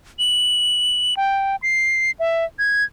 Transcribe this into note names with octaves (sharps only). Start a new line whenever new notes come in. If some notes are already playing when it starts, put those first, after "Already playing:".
F#7
G5
C7
E5
G#6